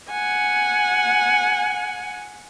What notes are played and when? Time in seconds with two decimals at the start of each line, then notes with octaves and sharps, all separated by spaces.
0.10 F#5 G#5